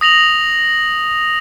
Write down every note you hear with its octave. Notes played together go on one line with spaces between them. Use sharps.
D#6 A#6 F7 F#7